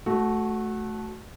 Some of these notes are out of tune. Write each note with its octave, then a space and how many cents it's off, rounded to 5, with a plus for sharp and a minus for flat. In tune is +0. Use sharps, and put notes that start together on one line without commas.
A3 -15 F#4 +0